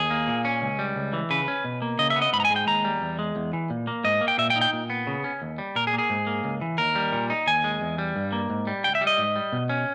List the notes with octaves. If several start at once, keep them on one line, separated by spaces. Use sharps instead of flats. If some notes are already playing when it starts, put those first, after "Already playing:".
Already playing: D#2 G#4
A#3
A#2
C#4
C#2
G3
C#2
E3
C#3 B4
C#4
B2
A#3
C#3 D#5
E5
B3
D#5
G#2 B5
A#5
G#5
G#3
G5
D#2 A#5
G3
E2
G#3
E2
E3
A#2
A#3
G#2 D#5
A#3
G5
A#2 E5
G5
D#4
G5
A#2
B3
C#3
C#4
D#2
G3
A#2 A#4
G#4
A#3
G#4
G#2
A#3
C#2
E3
D#2 A#4
G3
A#2
D#4
D#2 G#5
G#3
E2
G3
G2
A#3
G#2
G3
C#2 G5
E5
G3
D#5
G#2
G3
B2
C#4